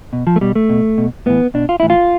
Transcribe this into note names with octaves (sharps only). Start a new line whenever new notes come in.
B2
F3
A3
B2 G3
A3
B2
B2
A2 E3 B3
B2 D4
F4
A2 E3 E4
F4